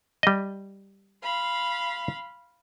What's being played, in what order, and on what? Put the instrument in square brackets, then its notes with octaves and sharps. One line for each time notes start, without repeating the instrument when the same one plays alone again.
[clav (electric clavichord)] G3 D#5
[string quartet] F5 B5 C6